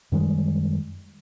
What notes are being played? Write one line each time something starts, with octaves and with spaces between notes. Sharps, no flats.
F#2 D#3 G3 G#3